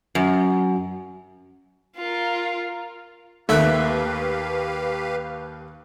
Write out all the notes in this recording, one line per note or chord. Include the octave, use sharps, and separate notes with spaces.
F#2
F4 A#4
D#2 A3 A#3 G4 B4 E5 F5 F#6